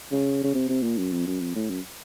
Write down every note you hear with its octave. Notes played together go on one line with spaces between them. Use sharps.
C#3
C#3
C3
C3
A#2
F#2
F2
F#2
F2
A2
F#2